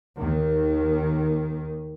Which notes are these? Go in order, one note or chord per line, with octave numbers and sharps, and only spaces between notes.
D#2 D#3